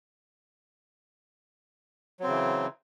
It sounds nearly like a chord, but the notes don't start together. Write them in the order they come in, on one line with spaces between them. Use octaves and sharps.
F#3 C4 C#3 E3